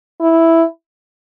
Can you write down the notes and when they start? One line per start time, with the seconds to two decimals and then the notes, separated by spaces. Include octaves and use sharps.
0.21 E4